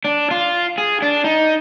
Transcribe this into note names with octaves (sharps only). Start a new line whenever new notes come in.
D4
F4
G#4
D4
D#4